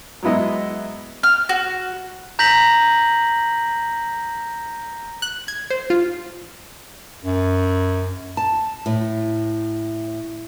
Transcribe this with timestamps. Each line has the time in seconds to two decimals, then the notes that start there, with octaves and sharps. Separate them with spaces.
0.23 F#3 G#3 B3 E4 D#5
1.23 F6
1.49 F#4
2.39 A#5 G6 A#6 B6 F#7
5.22 F#6
5.48 G#6
5.70 C5
5.90 F4
7.25 F#2
8.37 A5
8.86 A2